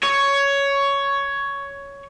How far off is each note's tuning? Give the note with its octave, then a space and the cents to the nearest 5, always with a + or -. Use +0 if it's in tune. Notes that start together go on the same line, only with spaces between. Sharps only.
C#5 +10